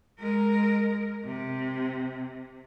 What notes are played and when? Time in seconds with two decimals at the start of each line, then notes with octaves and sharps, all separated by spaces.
0.20 G#3 A#4
1.25 C3